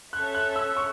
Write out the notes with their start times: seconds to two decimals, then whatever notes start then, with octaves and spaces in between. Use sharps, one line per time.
0.13 C#4 A4 C#5 E5 F#6
0.35 F#6
0.56 E6
0.77 C#6